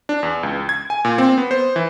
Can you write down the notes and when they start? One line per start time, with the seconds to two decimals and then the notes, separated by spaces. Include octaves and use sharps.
0.09 D4
0.23 E2
0.43 C#2
0.69 G#6
0.90 G#5
1.05 A#2
1.18 C4
1.38 B3
1.51 C5
1.76 E3